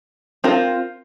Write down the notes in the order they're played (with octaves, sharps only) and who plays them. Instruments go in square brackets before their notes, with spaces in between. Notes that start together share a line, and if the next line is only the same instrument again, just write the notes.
[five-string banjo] C4 F4 A#4